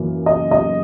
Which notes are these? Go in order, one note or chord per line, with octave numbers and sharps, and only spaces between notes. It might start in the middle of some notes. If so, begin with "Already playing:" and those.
Already playing: F#2 E3 A#3
D#5
D#5